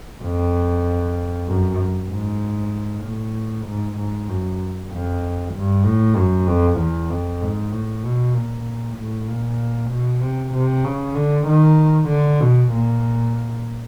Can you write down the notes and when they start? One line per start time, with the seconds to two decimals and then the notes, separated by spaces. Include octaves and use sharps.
0.23 F2
1.48 F#2
2.10 G#2
3.04 A2
3.67 G#2
3.98 G#2
4.30 F#2
4.91 F2
5.54 G2
5.85 A2
6.17 F#2
6.47 F2
6.79 E2
7.10 F2
7.41 G#2
7.72 A2
8.04 B2
8.34 A#2
8.97 A2
9.28 A#2
9.91 B2
10.22 C3
10.54 C3
10.84 C#3
11.15 D3
11.47 D#3
12.09 D3
12.41 B2
12.72 A#2